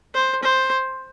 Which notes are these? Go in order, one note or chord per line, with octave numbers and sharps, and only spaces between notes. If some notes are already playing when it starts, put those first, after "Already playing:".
C5
C5